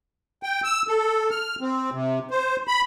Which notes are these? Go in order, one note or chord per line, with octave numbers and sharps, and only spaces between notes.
G5
E6
A4
F6
C4
C3
C5
B5